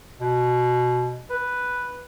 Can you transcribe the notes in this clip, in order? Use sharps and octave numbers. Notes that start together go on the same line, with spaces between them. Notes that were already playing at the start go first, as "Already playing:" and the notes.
B2
B4